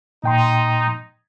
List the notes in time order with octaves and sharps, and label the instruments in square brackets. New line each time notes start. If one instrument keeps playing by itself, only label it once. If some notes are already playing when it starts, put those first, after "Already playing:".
[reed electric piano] A#2 G5 C6 [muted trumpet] D#4